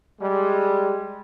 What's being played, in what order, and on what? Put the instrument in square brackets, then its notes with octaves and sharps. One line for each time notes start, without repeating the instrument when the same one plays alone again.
[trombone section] G3 G#3